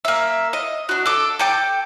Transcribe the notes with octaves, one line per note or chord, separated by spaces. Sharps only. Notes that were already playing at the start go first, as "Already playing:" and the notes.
A#3 E5
D#5
D4 F#4
A4 D6
A4 G5 D6